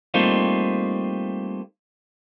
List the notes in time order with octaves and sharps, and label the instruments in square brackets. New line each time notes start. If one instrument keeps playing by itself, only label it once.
[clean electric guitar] G3 A3 A#3 C4 D#4 F4